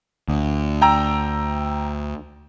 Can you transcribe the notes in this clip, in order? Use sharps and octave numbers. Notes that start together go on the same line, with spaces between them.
D2
G5 A#5 E6